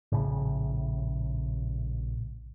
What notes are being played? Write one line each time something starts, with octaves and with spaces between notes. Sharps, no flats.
A#1 A2 C#3